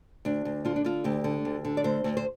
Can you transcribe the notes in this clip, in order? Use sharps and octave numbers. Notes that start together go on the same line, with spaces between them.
D2 D4
D2
D3 F4
D4
D3 F4
D2 G4
D3
D2
D3
D5
D2 C5
D2
C5